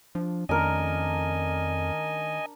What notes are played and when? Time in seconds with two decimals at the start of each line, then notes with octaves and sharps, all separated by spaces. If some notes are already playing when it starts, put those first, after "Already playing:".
0.15 F3 D4
0.49 F2 D#3 A3 C#4 D4 A#4 D#5 G#5